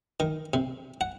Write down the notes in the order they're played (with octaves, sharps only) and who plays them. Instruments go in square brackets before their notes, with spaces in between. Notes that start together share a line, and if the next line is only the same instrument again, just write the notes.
[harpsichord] D#3
C3
F#5